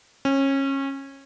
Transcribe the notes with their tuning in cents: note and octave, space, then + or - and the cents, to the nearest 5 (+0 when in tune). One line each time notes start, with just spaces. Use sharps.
C#4 -25